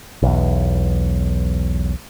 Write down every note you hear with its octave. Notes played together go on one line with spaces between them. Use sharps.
B1 E2